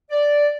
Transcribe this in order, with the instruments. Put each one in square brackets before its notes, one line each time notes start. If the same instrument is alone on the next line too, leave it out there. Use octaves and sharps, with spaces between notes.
[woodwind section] D5